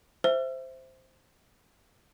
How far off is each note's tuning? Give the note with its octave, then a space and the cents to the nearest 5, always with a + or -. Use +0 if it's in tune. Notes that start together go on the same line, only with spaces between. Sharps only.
C5 +0 E5 +0 E6 +45